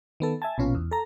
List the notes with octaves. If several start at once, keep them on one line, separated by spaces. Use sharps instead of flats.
D#3 B3 A4
E5 G#5 A5
A#1 B2 C#4 F4
E2
A4 A#5